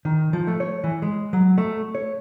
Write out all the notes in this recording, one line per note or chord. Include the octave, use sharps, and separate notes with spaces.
D#3
F3
A3
C#5
E3
G#3
F#3
A3
C#5